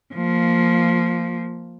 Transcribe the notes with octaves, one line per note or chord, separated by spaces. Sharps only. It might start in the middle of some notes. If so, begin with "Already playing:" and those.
F3 A#3